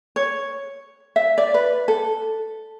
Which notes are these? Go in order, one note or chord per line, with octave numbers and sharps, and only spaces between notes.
C#5
E5
D5
B4
A4